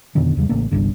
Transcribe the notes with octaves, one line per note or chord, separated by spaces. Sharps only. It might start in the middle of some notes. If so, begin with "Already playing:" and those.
F2 B2 D3 D#3
E2 C#3 G3
A1 C#3 A3 A#3
G1 C2 G2 D3